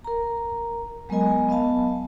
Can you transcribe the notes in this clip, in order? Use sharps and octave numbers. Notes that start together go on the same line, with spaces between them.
A#4 A#5
F#3 G#3 B3 A#4 D#5 G#5
B3 D#5 F5 A5